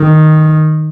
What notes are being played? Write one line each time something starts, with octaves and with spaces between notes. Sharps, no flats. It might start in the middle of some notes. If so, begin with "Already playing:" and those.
Already playing: D#3